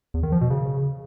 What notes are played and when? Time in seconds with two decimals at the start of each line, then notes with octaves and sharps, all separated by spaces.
0.14 E2
0.23 D#3
0.32 F3
0.41 B2
0.50 C#3